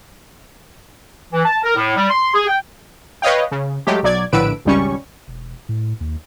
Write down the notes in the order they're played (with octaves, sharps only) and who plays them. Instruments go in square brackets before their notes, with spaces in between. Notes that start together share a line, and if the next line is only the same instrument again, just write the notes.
[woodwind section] E3
A5
A#4
A2
G3
C6
G#4
G5
[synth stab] B4 C#5 D#5 F5 G5
C#3
F#3 G#3 A3 G4
B1 F#3 D5 G#6
A#1 A2 D3 B4 E6 D7
G#1 C#2 G3 C#4 C#6
[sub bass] E1
A2
D#2